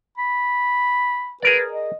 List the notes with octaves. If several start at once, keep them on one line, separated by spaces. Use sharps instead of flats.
B5
G#4 A#4 B4 D5
D#5